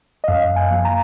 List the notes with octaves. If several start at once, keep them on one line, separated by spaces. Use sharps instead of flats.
D#5
F#2 F5
G#5
F3 A#3
A#5